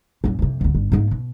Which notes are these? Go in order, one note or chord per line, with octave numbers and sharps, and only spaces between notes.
F#2 A#2
F2 C3
D1 D2
G1
G#2 A#3
B2